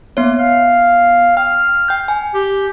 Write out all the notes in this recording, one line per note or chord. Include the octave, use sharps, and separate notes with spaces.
A#3 B3 C#5
F5
G5 F6
G5 G6
G#5
G4